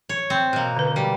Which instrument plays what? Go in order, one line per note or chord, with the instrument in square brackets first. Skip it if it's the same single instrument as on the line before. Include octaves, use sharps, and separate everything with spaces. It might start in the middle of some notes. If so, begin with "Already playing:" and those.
[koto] C#5
C4
B2 A#3
[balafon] D3 B4
[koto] G3